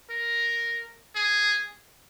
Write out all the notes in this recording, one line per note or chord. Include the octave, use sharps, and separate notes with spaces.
A#4
G#4